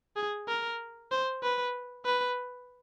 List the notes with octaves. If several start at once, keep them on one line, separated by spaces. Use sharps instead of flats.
G#4
A#4
C5
B4
B4